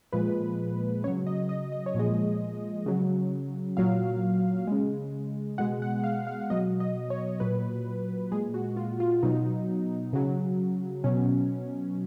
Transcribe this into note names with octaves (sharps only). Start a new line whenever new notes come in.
A#2 F3 G#3 B4
C#3 F#3 C#5
D#5
D#5
D#5
C#5
A#2 F3 G#3 D#5
C#3 F#3
A#2 F#3 F5
C#3 G#3
B2 G#3 F#5
F#5
F5
F5
B2 F#3 D#5
D#5
C#5
A#2 F#3 B4
A#2 G#3 G#4
F#4
F4
F4
B2 F#3 D#4
C#3 F#3
B2 F#3 C#4